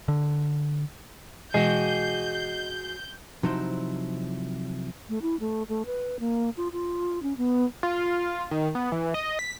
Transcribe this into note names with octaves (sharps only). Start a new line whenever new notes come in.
D3
B2 E3 G#3 F#4 G#4 D#5 G6
C3 F3 F#3 D#4 E4 C5
A3
E4
A3
A3
B4
A#3
F4
F4
C#4
B3
F4
D#3
B3
E3
D#5
B6